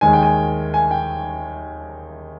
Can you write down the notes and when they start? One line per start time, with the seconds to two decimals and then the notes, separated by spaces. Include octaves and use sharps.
0.01 D#2 D#3 G#3 G#5
0.13 G5
0.23 G#5
0.74 G#5
0.91 G5